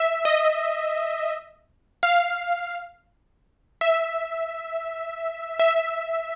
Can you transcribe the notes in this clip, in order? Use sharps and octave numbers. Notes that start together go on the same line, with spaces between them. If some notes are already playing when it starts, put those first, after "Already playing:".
Already playing: E5
D#5
F5
E5
E5